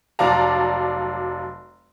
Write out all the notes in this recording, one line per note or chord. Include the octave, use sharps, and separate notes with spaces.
F1 F#3 D5 F5 A5 A#5